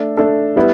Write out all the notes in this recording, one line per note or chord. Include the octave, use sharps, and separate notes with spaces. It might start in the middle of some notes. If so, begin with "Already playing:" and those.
Already playing: A3 D4 A4
A3 D4 A4
G3 B3 E4